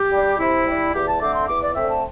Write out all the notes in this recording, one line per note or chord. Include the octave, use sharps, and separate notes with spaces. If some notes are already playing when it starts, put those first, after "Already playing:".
Already playing: G4
G3 D4
C3 E4
G3 D4
E2 G4
A5
D3 A3 C4 D6
C6
E2 D6
D5
D3 A3 C4 E5
A5